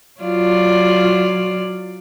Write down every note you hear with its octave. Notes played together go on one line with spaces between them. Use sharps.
F#3 F4 D5